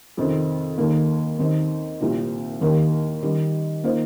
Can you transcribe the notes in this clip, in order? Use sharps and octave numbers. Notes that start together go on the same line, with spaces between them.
F2 C3 D#3 C4
D#2 D#3 A#3
D#2 D#3 C4 D#4
C2 A#2 F3 C4 G4
D#2 D#3 A#3 G4 A#4
D#3 G3 D#4
D#3 A#3 F4 C5